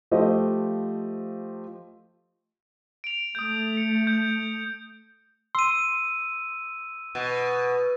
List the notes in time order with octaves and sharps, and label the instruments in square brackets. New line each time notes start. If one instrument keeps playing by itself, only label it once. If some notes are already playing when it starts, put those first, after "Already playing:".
[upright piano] F3 A3 F4 G4 C5 D#5
[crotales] D7 F7
[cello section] A3 [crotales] D#6 G6
[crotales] C#7
G6
[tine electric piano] C6 [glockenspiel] E6 D#7
[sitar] B2